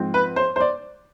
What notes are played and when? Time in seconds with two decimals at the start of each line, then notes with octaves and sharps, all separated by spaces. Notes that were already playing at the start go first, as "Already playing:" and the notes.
Already playing: G#2 F3 C4
0.14 B4
0.36 C5
0.56 C5
0.60 D5